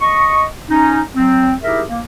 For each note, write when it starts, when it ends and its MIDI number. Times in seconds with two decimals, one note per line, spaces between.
0.01 0.43 75
0.01 0.43 85
0.68 1.00 61
0.68 1.00 63
1.14 1.52 54
1.14 1.52 60
1.62 1.82 63
1.62 1.82 64
1.62 1.82 67
1.62 1.82 68
1.62 1.82 70
1.62 1.82 76
1.89 2.00 58